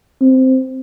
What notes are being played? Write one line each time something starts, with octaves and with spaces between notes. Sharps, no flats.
C4